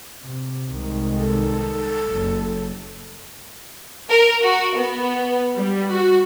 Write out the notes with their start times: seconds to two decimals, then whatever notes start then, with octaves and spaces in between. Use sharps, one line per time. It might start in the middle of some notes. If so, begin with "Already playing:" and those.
0.25 C3
0.70 C2 D#3 G#3
1.17 A4
2.08 F#1
4.09 A#4
4.43 F#4
4.76 B3
5.54 G3
5.91 F#4